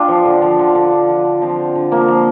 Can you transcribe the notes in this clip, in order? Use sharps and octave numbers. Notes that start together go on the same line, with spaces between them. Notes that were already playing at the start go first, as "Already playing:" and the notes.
Already playing: D4 F4 G4
F3
D3
F3
D3
D3
F3
F3
D3
F3 C4
D3
D3
F3 A#3
F3